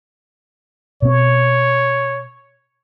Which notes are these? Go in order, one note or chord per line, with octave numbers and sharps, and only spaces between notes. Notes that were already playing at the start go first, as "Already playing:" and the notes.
B2 C4 C#5